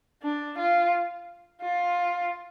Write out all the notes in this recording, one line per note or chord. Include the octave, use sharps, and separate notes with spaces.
D4
F4
F4